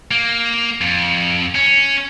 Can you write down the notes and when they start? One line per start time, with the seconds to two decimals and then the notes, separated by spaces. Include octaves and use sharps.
0.11 A#3
0.81 F2
1.55 C#4